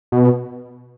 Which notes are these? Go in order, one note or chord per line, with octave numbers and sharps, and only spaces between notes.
B2